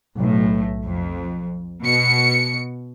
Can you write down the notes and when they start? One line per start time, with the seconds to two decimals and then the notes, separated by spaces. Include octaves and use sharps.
0.17 B1 A2
0.84 F2
1.84 B2 C#7